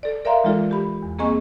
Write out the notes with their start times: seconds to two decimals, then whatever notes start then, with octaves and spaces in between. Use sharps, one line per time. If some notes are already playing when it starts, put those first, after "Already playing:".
0.03 A4 D5
0.25 A#4 D5 E5 F5 A#5 C6
0.44 E3 G#3 D#4 F4 A4 D5
0.71 G4 B5
1.03 E2
1.19 A#3 C4 G#4 D#5 G#5 C#6